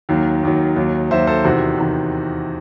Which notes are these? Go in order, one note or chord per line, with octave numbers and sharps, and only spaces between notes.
D#2 D#3 F#3
D#2 D#3 F#3
D#2 D#3 F#3
D#2 D#3 F#3 C5 E5
A4 C5
E2 C3 D#3 F#4
E2 C3 D#3